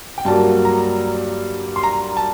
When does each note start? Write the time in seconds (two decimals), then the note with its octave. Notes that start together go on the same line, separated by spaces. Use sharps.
0.18 G5
0.25 G2 F#3 A#3 A5
0.65 A#5
1.76 C6
1.83 A#5
2.17 A5